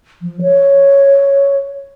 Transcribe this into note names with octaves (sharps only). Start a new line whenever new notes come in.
F3
C#5